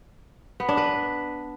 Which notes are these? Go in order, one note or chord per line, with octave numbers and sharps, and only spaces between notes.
B3
D4
B4